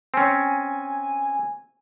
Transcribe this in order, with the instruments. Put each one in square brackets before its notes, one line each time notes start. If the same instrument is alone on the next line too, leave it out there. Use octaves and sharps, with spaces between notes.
[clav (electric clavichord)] C4 C#4 [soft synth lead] G#5